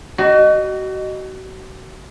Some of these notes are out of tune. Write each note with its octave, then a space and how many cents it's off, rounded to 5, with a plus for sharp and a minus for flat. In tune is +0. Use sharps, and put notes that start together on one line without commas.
F#4 +35 D#5 -15